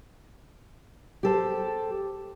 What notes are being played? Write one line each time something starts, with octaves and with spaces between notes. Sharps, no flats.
G4 A4 C5